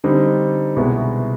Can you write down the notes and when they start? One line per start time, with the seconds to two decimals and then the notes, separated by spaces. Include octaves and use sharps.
0.04 D3 G3 C4 D#4
0.76 C2 B2 G#3 B3 E4